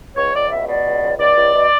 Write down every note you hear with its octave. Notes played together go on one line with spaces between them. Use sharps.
C#2 C#5
C#2 D5
B2 E5
B2 D5
C#2
C#2
C#2 D5
C#2
B2